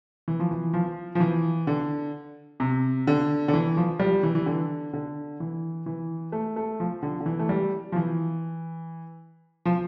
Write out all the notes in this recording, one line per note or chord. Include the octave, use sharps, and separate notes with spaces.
E3
F3
E3
F3
F3
E3
D3
C3
D3
D3
E3
F3
G3
E3
E3
D3
D3
E3
E3
A3
A3
F3
D3
D3
E3
A3
G3
F3
E3
F3